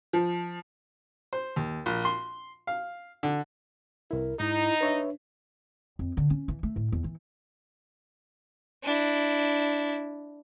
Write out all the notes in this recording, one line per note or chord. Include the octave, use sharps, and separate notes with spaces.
F3
C5
D#2
A#1
C6
F5
D3
C2 E4 A#4
G#2 D#4 E4
D4 B4 C#5 E5
F2
D3
C#4
E3
A3
A2
E2
E3
D4 E4